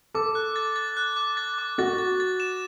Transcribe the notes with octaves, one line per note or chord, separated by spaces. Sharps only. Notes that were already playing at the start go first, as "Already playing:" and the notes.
A4 D6
F#6
A6
A6
F#6
D6
A6
D6
F#4 A6
A6
A6
E7